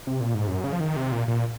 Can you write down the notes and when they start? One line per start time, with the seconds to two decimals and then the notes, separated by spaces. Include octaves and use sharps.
0.07 C3
0.20 A#2
0.34 G#2
0.47 F#2
0.64 C#3
0.73 F3
0.80 D#3
0.96 C3
1.12 A#2
1.28 A#2